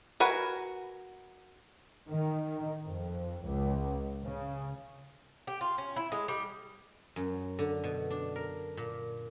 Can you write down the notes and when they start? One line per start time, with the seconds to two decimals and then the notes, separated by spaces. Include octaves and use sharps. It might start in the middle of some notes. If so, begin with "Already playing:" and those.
0.20 F#4 A#4 B4 G#5
2.08 D#3
2.84 F2
3.45 C#2
4.24 C#3
5.47 G4
5.61 F4
5.78 C#4
5.96 E4
6.12 G#3
6.28 G3
7.16 F#2
7.59 D3
7.84 B2
8.10 D4
8.36 A#4
8.77 A#2